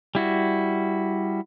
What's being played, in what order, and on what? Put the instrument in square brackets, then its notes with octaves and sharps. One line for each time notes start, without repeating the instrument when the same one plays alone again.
[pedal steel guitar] G3 E4 F#4